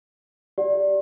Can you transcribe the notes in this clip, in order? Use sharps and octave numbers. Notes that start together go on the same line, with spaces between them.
G4 D5 F#5